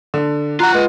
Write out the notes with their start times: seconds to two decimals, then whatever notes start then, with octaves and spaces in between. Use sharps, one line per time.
0.14 D3
0.60 F4 F#5 A#5 F#6
0.74 G#3 B4